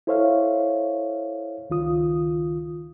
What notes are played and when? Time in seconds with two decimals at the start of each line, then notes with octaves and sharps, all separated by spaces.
0.07 E4 A4 C5 C#5 E5 F5
1.70 C#2 D#3 F4 D#6